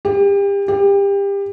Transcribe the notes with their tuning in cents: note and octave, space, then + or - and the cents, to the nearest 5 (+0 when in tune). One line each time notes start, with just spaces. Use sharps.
G4 +30
G4 +25